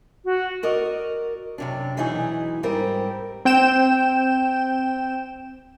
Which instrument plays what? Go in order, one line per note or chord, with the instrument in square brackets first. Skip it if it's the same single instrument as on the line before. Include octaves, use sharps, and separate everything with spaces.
[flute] F#4
[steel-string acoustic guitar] F#4 A#4 D5 D#5
F#2 C3 D4
B2 E3 F#3 D#4 E4 G#4
G#2 G3 C4 G4 A#4
[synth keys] C4 G5 G6 E7